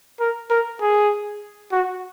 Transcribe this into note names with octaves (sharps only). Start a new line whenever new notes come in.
A#4
A#4
G#4
F#4